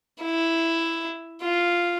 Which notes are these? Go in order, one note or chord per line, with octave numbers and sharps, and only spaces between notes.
E4
F4